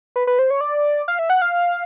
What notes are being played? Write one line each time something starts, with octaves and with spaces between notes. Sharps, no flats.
B4
B4
C5
C#5
D5
F5
E5
F#5
F5